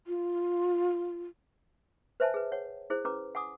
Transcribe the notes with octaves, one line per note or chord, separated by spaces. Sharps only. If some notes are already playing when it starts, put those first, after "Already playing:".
F4
B4 C5 E5 G#5 A5
G#4 B4
C#5 F#5
E4 G#4 C5
C#4 B4 A#5 D6
F#5 G#5 D6 D#6